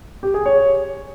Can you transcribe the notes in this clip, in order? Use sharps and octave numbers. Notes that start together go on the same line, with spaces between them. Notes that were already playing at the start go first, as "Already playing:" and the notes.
G4
G#4
C#5